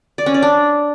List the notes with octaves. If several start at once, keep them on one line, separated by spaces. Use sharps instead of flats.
D5
C#4
D5
D4